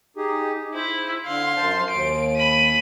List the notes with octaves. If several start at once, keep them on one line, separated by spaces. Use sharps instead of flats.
D#4 G4 G#4
E4 C5 E5
D3 F5 C6
F#2 C5 A5
D#2 D7
B5 D#7